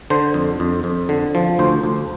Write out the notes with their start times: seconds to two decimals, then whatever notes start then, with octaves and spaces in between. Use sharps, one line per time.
0.10 D3 C5
0.34 F2
0.60 F2
0.84 F2
1.09 D3
1.35 F3
1.59 D2 C5
1.83 D2